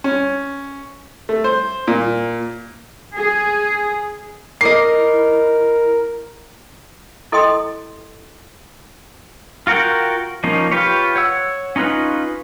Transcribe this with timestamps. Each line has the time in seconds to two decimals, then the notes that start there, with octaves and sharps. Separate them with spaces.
0.04 C#4
1.29 A3
1.44 C5
1.88 A#2
3.15 G#4
4.61 E4 A#4 D#5 D6 C7
7.32 E4 A4 D#5 G5 C6 D#6
9.67 F4 F#4 A#4 F#5 G5
10.44 F3 A#3 C#4 D#4
10.71 F4 G4 B4 C#5
11.16 C#5 F#5 E6
11.76 C#4 D#4 F4 B4